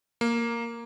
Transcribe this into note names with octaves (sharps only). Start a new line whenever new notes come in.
A#3